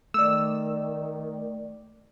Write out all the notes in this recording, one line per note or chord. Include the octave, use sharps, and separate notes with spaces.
D#3 A3 D5 E6